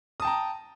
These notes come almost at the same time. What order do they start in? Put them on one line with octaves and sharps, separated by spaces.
D#6 A5 G5 A#5